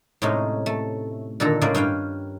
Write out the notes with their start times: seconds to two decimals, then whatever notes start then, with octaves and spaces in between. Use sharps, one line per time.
0.22 A2 C3 G#3 C#4 D#4
0.66 A3
1.40 A#2 D3 D#3 A4 A#5
1.61 A2 C#3 G#3 A#3 D5
1.75 G2 C#4 F5 G5